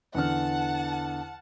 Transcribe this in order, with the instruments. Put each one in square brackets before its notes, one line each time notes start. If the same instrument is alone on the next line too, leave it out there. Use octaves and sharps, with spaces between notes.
[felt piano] E2 D3 F6 [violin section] F#5 A5